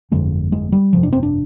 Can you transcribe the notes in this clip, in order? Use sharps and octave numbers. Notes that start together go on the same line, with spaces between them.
G1 F2 D3 G#3
G#3
G3
G1 F2 C3 F3
D4
C4
D4